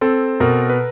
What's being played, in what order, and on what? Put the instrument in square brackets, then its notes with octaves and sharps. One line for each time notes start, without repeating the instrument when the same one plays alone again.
[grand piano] C4 [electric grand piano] A4
[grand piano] B2 [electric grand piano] A#4
[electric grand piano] B4